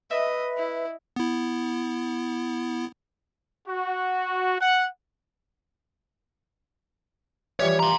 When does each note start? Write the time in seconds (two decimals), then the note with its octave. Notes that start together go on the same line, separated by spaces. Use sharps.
0.11 B4 D#5 E5
0.58 E4
1.16 B3 E4
3.67 F#4
4.60 F#5
7.60 E3 F3 G3 C#5
7.80 A#5 C6